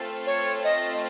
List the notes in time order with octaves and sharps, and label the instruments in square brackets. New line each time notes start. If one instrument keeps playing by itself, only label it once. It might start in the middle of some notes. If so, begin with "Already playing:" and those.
Already playing: [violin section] A3 C4 F4 A4
[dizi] C#5
D#5